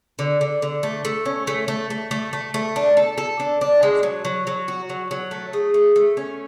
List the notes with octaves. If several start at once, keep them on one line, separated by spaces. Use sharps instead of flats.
D3
D3
D3
A3
A3
C#4
A3
A3
A3
A3
A3
A3
D4
A4
A4
D4
D4
G#3
F#3
F#3
F#3
F#4
F#3
F#3
A3
G#4
A3
A3
C#4